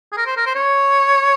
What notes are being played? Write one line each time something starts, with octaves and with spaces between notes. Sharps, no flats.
G#4
A#4
C5
A#4
C5
C#5